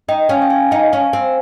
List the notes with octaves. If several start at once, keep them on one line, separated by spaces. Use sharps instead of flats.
D#4 D#5 G5
C#4 F5 G#5
G5
F5 G#5
D#4 F5 G#5
C#4 F5 G#5
C4